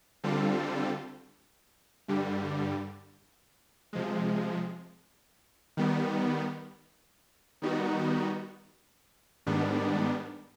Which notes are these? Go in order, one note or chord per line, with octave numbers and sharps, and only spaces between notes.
D3 G3 C4 F4 A4
G2 D3 G3
C3 F3 G#3
D#3 G3 B3
D#3 G3 B3 D#4 F#4
G#2 D#3 G3 B3 D4